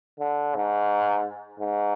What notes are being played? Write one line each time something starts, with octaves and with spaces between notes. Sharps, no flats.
D3
G#2
G#2